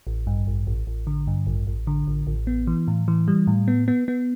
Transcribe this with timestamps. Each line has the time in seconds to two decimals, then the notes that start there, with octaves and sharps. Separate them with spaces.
0.07 A1
0.27 G2
0.47 A1
0.67 A1
0.87 A1
1.07 D3
1.27 G2
1.47 A1
1.67 A1
1.87 D3
2.07 A1
2.27 A1
2.47 B3
2.67 E3
2.87 A2
3.08 E3
3.28 G3
3.47 A2
3.68 B3
3.88 B3
4.08 B3